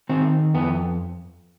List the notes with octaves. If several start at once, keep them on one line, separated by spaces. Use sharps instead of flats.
D#3 C4
F2 B3